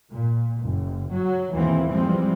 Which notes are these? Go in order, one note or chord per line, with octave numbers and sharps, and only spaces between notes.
A#2
F#1
F#3
D#2 B2 E3 G#3 A#3 C4
E3 F3 G3 G#3 C4